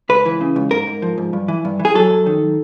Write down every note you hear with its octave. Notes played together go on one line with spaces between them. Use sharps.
C#2 B4
E3
C#3
C#2
G#2 A#4
G#2
F3
G#2
G2
E3
G2
E3
G#4
F#3 A4
F#2
D#3